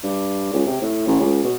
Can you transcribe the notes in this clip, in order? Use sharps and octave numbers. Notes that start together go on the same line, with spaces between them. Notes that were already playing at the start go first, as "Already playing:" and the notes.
G2
C#2
C3
A2
A1
C#2
B2